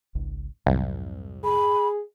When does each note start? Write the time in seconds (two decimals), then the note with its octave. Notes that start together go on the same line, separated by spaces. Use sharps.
0.15 G#1 C#2 G#2
0.66 C2 F2 G#2 F#3
1.44 G#4 B5